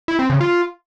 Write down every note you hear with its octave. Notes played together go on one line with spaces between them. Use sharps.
E4
C4
C#3
F4